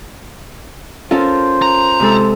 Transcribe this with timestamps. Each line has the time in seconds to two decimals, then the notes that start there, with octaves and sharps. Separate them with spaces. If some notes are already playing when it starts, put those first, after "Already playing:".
1.11 C#4 F4 A4 A#4 C5
1.62 A#5
2.00 C3 G#3 A4